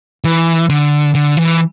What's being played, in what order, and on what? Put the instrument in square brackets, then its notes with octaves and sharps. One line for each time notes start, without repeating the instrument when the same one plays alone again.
[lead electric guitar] E3
D3
D3
E3